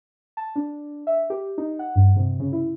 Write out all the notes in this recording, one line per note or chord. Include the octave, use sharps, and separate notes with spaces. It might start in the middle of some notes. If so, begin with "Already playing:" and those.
A5
D4
E5
G4
D#4
F#5
G2
C3
C#3
E4